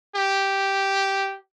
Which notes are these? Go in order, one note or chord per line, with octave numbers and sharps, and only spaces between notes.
G4